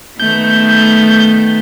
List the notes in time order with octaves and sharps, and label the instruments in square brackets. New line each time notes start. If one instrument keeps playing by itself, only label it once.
[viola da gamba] D#3 A3 B3 [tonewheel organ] G6